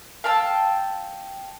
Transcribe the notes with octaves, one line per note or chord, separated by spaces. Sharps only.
F5 G5 A5 E6